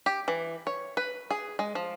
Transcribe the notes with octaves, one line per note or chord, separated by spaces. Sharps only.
G4
E3
C#5
B4
G#4
G#3
F3